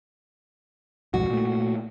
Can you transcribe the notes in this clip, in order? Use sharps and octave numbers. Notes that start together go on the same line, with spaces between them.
B1 F2 G#2 F#4
A#2 A3